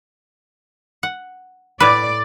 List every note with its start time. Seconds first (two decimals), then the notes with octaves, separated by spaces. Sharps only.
1.03 F#5
1.80 A2 B4 D5